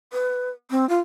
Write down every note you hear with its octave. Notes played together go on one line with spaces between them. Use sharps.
B4
C4
F4